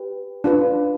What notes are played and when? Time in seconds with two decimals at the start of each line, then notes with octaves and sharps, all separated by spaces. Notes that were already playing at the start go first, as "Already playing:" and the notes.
Already playing: G4 B4
0.44 D4 F4 B4